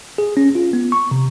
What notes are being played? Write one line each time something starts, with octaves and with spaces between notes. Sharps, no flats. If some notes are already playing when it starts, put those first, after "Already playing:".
G#4
C#4
F4
B3
C#6
C3